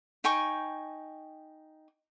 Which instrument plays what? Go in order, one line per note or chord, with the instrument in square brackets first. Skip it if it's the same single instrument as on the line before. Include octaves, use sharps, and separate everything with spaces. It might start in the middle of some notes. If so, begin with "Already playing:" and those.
[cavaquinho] D#4 G5 G#5 C#6